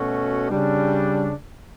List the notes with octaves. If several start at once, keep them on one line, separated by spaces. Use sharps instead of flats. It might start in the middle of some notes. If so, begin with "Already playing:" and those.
Already playing: B2 A3 C#4 F#4
C#3 G3 D4